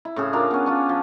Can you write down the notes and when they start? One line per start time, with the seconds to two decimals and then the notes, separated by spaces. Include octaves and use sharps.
0.05 E4
0.16 A2 C#3 G#4
0.33 D4 F4 A#4 C6
0.51 B3 C#4
0.66 C#4 D4 F4
0.89 F3